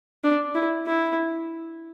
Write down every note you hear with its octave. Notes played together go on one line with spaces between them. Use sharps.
D4
E4
E4